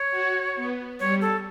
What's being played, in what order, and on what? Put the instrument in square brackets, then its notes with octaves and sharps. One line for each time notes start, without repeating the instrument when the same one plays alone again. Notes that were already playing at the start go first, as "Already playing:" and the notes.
Already playing: [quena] C#5
[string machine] F#4
B3
[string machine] G3 [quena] C#5
[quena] A4